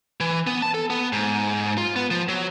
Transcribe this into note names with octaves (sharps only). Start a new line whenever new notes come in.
E3
B3
A5
A4
B3
G#2
F4
B3
F3
F#3